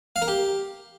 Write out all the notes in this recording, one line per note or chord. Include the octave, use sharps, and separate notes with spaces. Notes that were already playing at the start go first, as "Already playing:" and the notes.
F5
A#4
G4